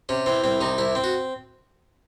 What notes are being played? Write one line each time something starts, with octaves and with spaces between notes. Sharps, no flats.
C3 C#4
E3 C4
C2 C4
C3 D#4
C2 E4
C4
F#4